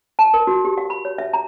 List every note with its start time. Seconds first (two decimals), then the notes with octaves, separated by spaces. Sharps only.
0.19 A5
0.34 A#4
0.47 F#4
0.65 G4
0.78 F5
0.90 B5
1.05 C#5
1.18 E5
1.33 A#5